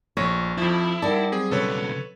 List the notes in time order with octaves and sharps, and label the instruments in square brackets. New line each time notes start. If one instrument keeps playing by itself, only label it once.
[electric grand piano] A#1 A#6 [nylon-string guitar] C#5
[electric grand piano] F2 F3 [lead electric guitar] E4
[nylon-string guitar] G3 D5 [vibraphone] D#4 A#4 F#5 [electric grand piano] A5
[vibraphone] F#3 [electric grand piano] C4 G#4
[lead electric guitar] B1 C#3 [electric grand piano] A4 B4 C#5